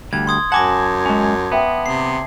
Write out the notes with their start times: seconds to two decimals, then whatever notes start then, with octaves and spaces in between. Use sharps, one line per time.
0.13 D2 G3 G#6
0.27 C6 D#6 G#6
0.52 F#2 F#5 G#5 A5 D6 A#6
1.06 G#3 C#4
1.52 B3 B4 E5 G5
1.86 C3 C7